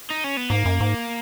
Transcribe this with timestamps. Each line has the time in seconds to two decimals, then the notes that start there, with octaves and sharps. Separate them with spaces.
0.10 D#4
0.24 C#4
0.37 B3
0.50 G#2 A#3
0.65 F#2
0.81 G#2